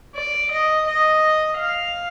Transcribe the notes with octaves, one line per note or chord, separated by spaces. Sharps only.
D5
D#5
D#5
F5